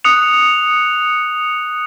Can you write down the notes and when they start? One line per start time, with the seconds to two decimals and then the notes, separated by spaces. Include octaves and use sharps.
0.04 D#6 F#6 C#7 F7